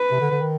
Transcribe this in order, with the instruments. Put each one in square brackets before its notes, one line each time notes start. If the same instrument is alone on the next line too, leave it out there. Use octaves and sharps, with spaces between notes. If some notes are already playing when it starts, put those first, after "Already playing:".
Already playing: [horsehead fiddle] B4
[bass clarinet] C3
D3
D3
D#3